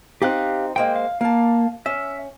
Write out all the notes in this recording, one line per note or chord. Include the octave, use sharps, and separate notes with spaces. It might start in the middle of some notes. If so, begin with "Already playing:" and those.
C4 D#4 G4 F5 F#6
G#3 A#3 C5 G5
F5
A#3 F5 A5
C#4 E5